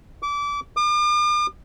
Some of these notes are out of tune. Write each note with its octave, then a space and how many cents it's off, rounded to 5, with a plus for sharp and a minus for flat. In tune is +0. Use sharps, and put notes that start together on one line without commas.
D6 -25
D6 +45